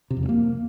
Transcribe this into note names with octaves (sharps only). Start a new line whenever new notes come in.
C3
F2
G2
A#3